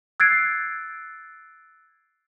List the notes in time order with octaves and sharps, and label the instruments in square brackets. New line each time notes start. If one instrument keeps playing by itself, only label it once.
[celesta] E6 F#6 G#6 A6 C7 D7